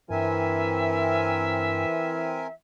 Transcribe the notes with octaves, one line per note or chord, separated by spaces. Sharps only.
G2 E3 C4 A#4 E5 G#5